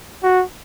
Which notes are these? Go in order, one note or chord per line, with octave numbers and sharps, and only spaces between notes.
F#4